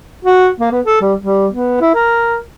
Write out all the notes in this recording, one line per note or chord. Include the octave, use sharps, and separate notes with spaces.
F#4
A#3
B3
A4
G3
G3
B3
E4
A#4